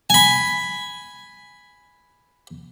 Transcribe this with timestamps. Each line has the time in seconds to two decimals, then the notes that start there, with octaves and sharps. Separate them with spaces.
0.10 G#5 B5